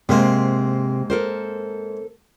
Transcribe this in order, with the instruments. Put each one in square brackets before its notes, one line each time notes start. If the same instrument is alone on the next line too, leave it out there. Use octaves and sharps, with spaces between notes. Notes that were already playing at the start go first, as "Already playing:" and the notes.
[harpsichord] G#2 A#3 C4 [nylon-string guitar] C3
[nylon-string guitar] A4 A#4 C5